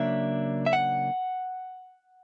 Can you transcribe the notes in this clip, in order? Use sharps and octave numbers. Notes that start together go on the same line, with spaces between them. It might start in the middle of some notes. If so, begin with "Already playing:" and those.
Already playing: C#3 F#3 A#3 D4 E5
E5
F#5